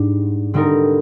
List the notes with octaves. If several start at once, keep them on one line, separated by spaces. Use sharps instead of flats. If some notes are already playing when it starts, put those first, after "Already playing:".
Already playing: G#2 G3 D4
D3 G3 C4 D#4 A#4